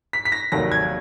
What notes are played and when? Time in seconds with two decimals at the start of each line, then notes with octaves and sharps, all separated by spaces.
0.13 B6
0.25 B6
0.32 A#6
0.52 F1 D#2 D#3 F#3 A#6
0.72 G#6